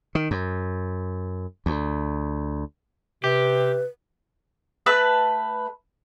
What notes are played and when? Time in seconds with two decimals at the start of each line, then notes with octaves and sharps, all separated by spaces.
0.15 D#3
0.31 F#2
1.66 D2
3.24 C3 G4 B4
4.86 A3 B4 E6 F#6